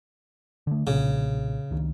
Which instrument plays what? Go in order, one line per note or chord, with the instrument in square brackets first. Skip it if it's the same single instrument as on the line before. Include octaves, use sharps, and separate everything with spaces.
[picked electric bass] D3 A3
[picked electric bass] B1 A#2 [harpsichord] C#3
[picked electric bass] C#2 D#3